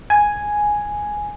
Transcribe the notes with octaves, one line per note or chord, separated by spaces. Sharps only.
G#5